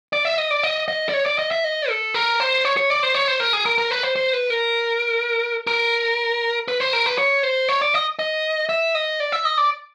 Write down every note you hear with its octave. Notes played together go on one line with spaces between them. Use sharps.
D5
E5
D#5
D5
D#5
D#5
D5
C#5
D5
D#5
E5
D#5
A4
A#4
C5
C#5
C#5
D5
C5
C#5
C5
A#4
G#4
A#4
A#4
B4
C5
C5
B4
A#4
A#4
B4
C5
A#4
B4
C#5
C5
C#5
D5
D#5
D#5
E5
D#5
D5
E5
D#5
D5